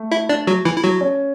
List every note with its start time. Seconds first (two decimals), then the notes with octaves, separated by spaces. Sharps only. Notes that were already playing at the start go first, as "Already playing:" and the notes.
Already playing: A3
0.12 E4 E5
0.29 D4 D5
0.47 F#3 F#4
0.65 E3 E4
0.77 E4
0.84 F#3 F#4
1.01 C#4